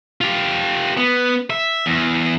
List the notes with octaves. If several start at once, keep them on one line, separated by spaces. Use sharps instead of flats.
F4 G4
B3
E5
E2